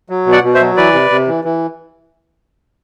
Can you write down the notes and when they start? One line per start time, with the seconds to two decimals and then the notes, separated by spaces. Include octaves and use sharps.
0.10 F#3
0.26 B2
0.32 D5 F#5
0.43 B2
0.54 C5 E5
0.61 F#3
0.77 E3 B4 D5
0.93 C3
1.10 C3
1.27 E3
1.44 E3